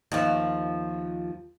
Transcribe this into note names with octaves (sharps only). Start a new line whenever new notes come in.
D#2 F3